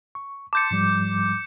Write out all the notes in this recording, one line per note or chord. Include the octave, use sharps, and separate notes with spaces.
C#6
A5 C6 D6 G6 A6 C#7
G#2 F3 G3